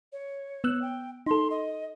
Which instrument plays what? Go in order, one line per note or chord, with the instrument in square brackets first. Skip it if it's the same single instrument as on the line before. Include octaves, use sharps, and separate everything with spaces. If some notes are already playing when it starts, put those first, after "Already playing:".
[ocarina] C#5
[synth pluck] B3 E6 F#6
[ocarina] G5
[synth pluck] D#4 A4 [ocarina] C6
[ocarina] D#5